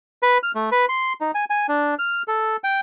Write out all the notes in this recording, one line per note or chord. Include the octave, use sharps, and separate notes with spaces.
B4
F6
A3
B4
C6
D#4
G#5
G#5
D4
F6
A4
G5